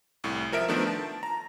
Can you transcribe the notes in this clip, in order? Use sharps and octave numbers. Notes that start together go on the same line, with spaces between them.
C2 A2
F3 A#4 E5 D7
D#3 F3 A3 B3 D4
A5
A#5